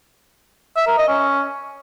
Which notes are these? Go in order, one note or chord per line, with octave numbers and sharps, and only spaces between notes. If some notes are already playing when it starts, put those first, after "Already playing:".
E5
A#4
D#5
C#4